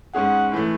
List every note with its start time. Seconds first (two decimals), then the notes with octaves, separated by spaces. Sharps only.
0.15 G#2 G#3 C#4 G#4 F#5
0.52 A2 E3 A3